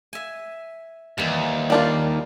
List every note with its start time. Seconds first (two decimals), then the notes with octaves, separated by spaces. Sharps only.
0.13 E5 G#5
1.18 D#2 E3 G3
1.70 G3 A#3 D4 F4